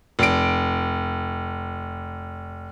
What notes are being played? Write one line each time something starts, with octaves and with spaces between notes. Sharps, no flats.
F1 D7